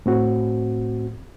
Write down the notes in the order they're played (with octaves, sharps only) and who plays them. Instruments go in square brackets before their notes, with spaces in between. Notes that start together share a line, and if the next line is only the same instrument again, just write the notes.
[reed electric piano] A2 C4 F#4